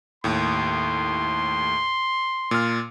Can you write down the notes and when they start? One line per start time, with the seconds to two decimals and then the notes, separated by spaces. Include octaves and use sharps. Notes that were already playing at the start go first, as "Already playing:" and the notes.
0.24 D#2 A2 C6
2.51 A#2 F6